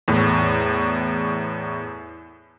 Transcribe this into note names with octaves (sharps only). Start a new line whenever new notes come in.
E2 A2